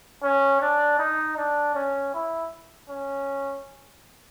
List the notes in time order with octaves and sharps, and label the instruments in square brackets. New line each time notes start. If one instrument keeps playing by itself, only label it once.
[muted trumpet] C#4
D4
D#4
D4
C#4
E4
C#4